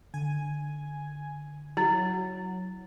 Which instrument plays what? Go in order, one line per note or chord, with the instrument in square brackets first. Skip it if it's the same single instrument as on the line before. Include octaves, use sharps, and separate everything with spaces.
[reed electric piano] D3 [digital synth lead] G#5
[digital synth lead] F#3 [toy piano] E4